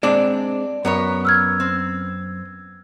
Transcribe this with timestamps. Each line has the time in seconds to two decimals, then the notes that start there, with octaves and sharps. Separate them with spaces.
0.03 G#3 C4 D4 D5
0.85 F#2 B3 A#4 C#5
1.25 E6 F6 G#6
1.60 C4